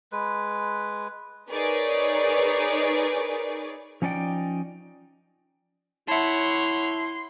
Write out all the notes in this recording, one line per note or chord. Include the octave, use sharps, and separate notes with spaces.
G#3 B4
D#4 G#4 A#4 B4 C#5 D5
F3 C#4 D#4 D5 G5
E4 C#5 E5 F#5 A5 C6